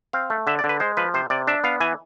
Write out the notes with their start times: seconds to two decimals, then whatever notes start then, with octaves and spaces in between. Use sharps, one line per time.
0.13 C4 F5
0.30 A3
0.47 D3 E5
0.59 D5
0.64 D3
0.69 B4
0.80 G#3 C5
0.97 F3 B4
1.14 C3 C5
1.30 C3 D5
1.47 D4 E5
1.64 B3 F5
1.80 E3 G#5